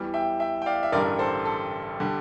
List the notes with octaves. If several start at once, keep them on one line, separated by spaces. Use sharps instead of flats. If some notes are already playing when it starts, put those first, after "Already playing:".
Already playing: E2 E3 G3
E5 G5
E5 G5
G5
D5 F5
E5
A1 G2 D3 G3 A#4 D5
A4 C5
A4
D3 G3